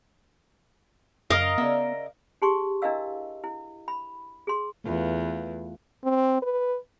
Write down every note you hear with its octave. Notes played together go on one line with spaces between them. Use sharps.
F#2 C#3 A#4 D#5 F5
C#3 B3 D5 E5
G4 G#4 A5 C6 C#6
D4 E4 A#4 D#5 F5 E6
E4
B5
G#4 C6
E2 A3 F4 B4
C4
B4